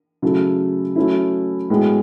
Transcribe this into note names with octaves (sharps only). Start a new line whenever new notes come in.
C#3 F#3 A3 E4 A4
F#3 A3 C#4 E4
A2 G#3 B3 F#4